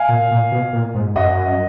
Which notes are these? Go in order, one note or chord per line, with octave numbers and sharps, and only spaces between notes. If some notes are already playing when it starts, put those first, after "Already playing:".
Already playing: F5 G#5
A#2
A#2
B2
A#2
G#2
F#2 D#5 F#5